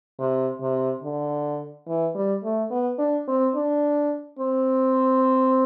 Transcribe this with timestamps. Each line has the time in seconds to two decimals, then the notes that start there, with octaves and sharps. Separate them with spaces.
0.19 C3
0.61 C3
1.03 D3
1.88 E3
2.15 G3
2.44 A3
2.71 B3
2.99 D4
3.28 C4
3.55 D4
4.39 C4